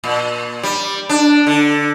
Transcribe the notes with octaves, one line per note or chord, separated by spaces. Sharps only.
A#2
G3
D4
D3